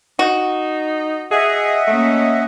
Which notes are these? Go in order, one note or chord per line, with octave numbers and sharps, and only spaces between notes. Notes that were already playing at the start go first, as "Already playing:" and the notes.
D#4 F#4
G#4 D#5 E5 F#5
A3 A#3 C#4